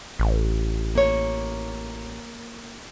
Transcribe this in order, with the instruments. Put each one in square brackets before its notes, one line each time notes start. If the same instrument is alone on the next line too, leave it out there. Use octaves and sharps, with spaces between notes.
[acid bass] A1
[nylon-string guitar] A#3 C#5